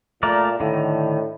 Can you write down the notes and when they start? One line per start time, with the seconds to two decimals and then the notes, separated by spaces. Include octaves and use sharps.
0.23 A#2 A3 A#4 D5
0.60 A2 D3 D#3